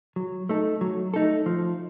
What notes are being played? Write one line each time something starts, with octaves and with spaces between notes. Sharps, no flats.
F#3
A3 D#4 A4
F#3
A3 D#4 A4
F3